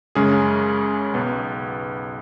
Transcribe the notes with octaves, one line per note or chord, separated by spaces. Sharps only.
F#2 C#3 G#3 C#4 G#4
B1 B2 B3